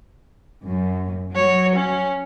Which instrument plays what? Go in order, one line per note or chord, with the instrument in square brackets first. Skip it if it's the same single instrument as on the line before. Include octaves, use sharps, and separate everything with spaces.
[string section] F#2
[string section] F#3 [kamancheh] C#5
[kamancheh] C#4